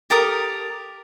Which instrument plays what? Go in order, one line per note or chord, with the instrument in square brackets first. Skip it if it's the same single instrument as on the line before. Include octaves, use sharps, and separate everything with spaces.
[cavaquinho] G4 A4 A#4 D#6